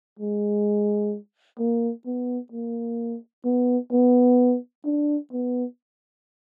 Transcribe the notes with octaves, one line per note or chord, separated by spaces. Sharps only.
G#3
A#3
B3
A#3
B3
B3
D4
B3